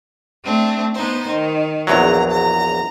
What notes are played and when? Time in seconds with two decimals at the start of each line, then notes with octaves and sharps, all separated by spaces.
0.44 A3 C4 D4
0.94 B3 D#4 C5
1.28 D#3
1.87 A#1 E2 F#3 A#5
2.31 A#5